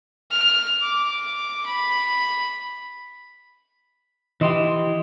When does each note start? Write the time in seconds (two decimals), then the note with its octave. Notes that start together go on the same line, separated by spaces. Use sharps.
0.31 F6
0.82 D6
1.66 B5
4.41 E3 E4 G4 D#5 C6